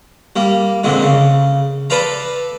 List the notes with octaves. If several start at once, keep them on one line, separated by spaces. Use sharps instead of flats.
G3 A#3
F2 A#2 D3 G#3
C#3
A4 B4 D5 F5 A#5